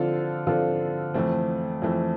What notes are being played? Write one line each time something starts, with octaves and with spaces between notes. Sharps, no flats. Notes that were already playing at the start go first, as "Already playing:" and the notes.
Already playing: D3 F3 C4 F4 A4
D3 F3 C4 F4 A4
F2 E3 A3 C4
F2 E3 A3 C4